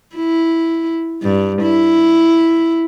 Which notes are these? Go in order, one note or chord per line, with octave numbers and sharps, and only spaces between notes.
E4
G2
E4